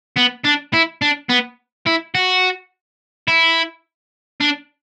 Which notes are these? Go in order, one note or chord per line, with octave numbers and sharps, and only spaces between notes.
B3
D4
E4
D4
B3
E4
F#4
E4
D4